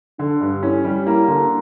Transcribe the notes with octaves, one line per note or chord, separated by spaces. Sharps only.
D3 D4
G2
C#4 E4
G3
A#3 E4
D3 D4